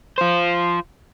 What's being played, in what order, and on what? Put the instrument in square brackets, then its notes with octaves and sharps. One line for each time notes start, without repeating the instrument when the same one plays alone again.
[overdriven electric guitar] F4 C5